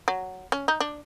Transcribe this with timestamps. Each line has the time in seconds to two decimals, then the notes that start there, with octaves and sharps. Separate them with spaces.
0.08 F#3
0.52 C#4
0.68 D#4
0.81 D4